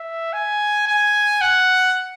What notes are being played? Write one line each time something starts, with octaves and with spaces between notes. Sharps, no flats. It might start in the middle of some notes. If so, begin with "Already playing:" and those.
Already playing: E5
G#5
G#5
F#5